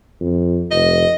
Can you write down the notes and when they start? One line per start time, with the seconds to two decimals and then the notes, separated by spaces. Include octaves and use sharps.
0.20 F2
0.71 F1 D#5